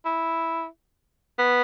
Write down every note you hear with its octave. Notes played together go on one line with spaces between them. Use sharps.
E4
B3